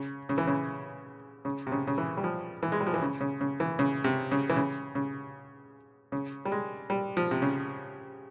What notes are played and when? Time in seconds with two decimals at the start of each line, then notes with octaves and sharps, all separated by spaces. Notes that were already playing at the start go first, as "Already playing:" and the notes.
Already playing: C#3
0.29 C#3
0.38 E3
0.47 C#3
1.45 C#3
1.67 C3
1.72 C#3
1.87 C#3
1.98 E3
2.17 G3
2.24 F3
2.63 E3
2.72 G#3
2.80 G3
2.87 F3
2.94 E3
3.02 C#3
3.21 C#3
3.41 C#3
3.60 E3
3.79 C#3
4.04 C3
4.31 C#3
4.49 E3
4.56 C#3
4.95 C#3
6.12 C#3
6.45 G3
6.52 G#3
6.90 G3
7.17 F3
7.31 C3
7.42 C#3